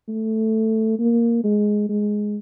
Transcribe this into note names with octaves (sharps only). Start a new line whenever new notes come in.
A3
A#3
G#3
G#3